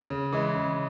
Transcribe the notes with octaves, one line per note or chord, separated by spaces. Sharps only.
C#3
E3 G#3
C#3